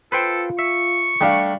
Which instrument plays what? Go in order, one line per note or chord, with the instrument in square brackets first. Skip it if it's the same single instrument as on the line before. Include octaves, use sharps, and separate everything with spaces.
[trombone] F4 [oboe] A4 [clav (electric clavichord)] B4 C5 G5
[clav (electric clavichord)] E5 [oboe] C#6
[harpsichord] G3 D4 F5 [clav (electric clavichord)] A3